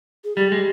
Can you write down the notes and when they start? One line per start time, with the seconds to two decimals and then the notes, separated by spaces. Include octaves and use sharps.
0.24 G#4
0.36 G3 G4
0.52 G#3